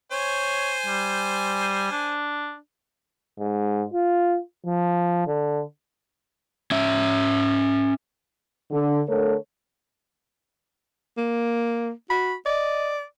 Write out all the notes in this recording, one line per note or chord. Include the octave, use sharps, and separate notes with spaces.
C5 C#5 G#5
G3
D4
G#2
F4
F3
D3
C#4 E5
D3
D3 A3 A4 A#4 C#5
A#3
F#4 B5
D5 D#5